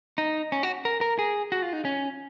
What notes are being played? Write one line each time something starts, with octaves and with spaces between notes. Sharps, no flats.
D#4
C#4
F#4
A#4
A#4
G#4
F#4
F4
D#4
C#4